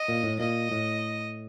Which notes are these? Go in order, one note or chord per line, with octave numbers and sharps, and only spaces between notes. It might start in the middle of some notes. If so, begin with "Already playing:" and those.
Already playing: D#5
A#2
A2
A#2 D#5
A2